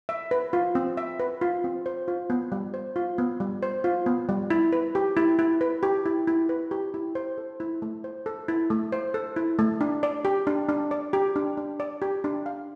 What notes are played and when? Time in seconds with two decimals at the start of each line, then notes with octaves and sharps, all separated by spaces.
0.09 E5
0.31 B4
0.53 F4
0.75 C4
0.97 E5
1.20 B4
1.41 F4
1.64 C4
1.86 C5
2.08 F4
2.30 B3
2.52 G3
2.74 C5
2.96 F4
3.18 B3
3.40 G3
3.63 C5
3.84 F4
4.06 B3
4.29 G3
4.50 E4
4.73 B4
4.95 G4
5.17 E4
5.39 E4
5.61 B4
5.83 G4
6.06 E4
6.27 E4
6.49 B4
6.71 G4
6.94 E4
7.15 C5
7.38 A4
7.60 E4
7.82 A3
8.04 C5
8.26 A4
8.48 E4
8.70 A3
8.92 C5
9.14 A4
9.36 E4
9.59 A3
9.81 D4
10.03 D5
10.25 G4
10.47 D4
10.69 D4
10.91 D5
11.13 G4
11.36 D4
11.57 D4
11.80 D5
12.02 G4
12.24 D4
12.46 F5